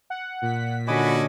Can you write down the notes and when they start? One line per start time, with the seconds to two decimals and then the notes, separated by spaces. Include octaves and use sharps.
0.10 F#5
0.42 A#2 B6
0.88 D3 C#4 F#4 D#5 G#5 B5 D6